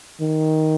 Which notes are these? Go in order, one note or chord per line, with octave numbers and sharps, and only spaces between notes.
D#3